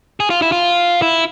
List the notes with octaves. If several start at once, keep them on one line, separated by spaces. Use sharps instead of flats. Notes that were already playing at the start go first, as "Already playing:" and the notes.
G#4
F4
E4
F4
E4